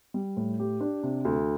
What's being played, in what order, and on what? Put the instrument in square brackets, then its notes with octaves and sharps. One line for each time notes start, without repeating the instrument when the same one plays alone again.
[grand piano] G3
A2
G4
D4
C3
D2